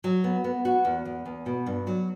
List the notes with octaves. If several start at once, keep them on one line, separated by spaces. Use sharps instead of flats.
F#3
B3
B3
F#4
E2
E2
E2
B2
G2
F#3